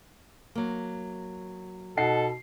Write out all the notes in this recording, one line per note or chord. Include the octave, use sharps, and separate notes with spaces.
F#3 A#3
B2 D#4 A4 F#5 C7